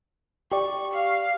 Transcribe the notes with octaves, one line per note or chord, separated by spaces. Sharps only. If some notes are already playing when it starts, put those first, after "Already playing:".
G4 D5 C#6
F5